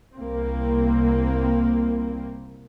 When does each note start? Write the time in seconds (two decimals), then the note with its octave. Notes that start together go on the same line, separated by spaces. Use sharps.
0.16 C2 A#3 C4